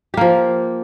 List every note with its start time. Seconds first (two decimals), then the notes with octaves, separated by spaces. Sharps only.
0.14 G4
0.17 A#3
0.21 F3